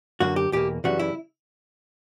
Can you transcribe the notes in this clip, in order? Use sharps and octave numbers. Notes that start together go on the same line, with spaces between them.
F#2 D3 A#3 F#4
G4
E2 B2 A#3 G4
F#2 C#3 E3 G3 F#4
E4